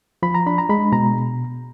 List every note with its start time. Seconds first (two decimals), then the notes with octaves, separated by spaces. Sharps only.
0.23 F3 B5
0.35 A#5
0.46 D4 B5
0.58 A#5
0.69 G#3 B5
0.92 B2 A#5